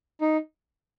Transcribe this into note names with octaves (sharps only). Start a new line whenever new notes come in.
D#4